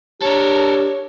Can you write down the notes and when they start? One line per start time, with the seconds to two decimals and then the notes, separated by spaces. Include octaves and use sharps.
0.22 D4 G4 A4 A#4 C#5